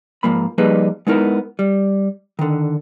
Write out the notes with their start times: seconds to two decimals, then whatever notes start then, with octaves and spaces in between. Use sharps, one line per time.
0.23 G#2 F3 A#3 B5
0.58 F3 G3 A#3 D#4 G#4 B4
1.07 G#3 B3 D#4 E4 A#4
1.59 G3
2.39 D3 D#3